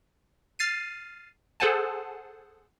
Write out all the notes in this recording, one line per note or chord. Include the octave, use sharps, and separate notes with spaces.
F6 A6 C7 D#7
G#4 A4 C5 F#5 G#5 A5